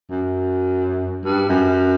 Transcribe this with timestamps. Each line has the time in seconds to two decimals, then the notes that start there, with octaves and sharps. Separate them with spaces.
0.10 F#2
1.24 G2
1.49 F#2